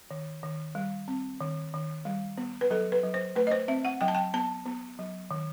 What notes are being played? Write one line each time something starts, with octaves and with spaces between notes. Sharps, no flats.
D#3
D#3
G3
C4
D#3
D#3
G3
B3
B4
F#3 A4
B4
F#3
C5
A3 B4
D#5
C5
C4 E5
F#5
F#3 G5
A5
G5
B3 A5
B3
F#3
D#3